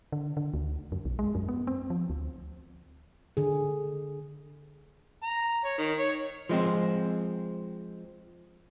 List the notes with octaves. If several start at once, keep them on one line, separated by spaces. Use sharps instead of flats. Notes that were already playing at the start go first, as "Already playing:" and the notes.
D3
D3
D2
F#2
B1
G#3
F#2
B3
C4
F3
D2
D3 G#4
A#5
C#5
D#3
C#5
F3 G#3 C4